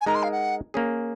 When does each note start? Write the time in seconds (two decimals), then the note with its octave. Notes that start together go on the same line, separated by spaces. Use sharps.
0.01 G#5
0.06 G#3 D#4 A#4 A#5
0.15 C6
0.23 F5
0.32 F#5
0.74 A#3 C#4 G#4